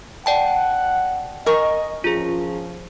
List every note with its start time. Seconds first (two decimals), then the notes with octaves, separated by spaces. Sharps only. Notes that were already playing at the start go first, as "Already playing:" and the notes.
0.26 D5 F#5 G5 A5
1.46 A#4 D#5 G#5 C#6
2.04 F3 C#4 F4 G#4